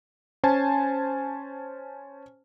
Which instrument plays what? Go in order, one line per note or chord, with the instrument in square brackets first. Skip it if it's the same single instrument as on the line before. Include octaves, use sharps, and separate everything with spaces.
[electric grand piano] C#4 C5 G#5 A5